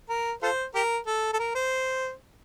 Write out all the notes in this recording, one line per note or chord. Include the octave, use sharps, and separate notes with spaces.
A#4
F4 A4 C5
G4 A#4
A4
A4
A#4
C5